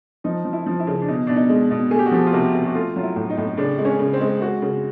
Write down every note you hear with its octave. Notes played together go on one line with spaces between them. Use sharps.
F3 D#4
F3
E4
F3
E4
C#3
D4
B2 D#4
B2 D4
D#4
G#3
B2
A3 G#4
G4
F#4
F3 G4
F4
C3 F#4
C3
F#4
A3 F4
F#3 F4
E4
A2
D#4
A2
C#3 D4
G#3
C#4
C#3
C4
G#3
G#3 F#4
C#3